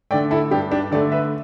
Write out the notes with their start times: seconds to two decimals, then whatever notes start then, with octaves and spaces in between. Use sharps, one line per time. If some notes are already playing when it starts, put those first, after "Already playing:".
0.11 D3 A3 D5 G5
0.31 E4 A4
0.51 G2 D4 G4
0.71 D4 G4
0.92 D3 A3 A4 D5
1.12 B4 E5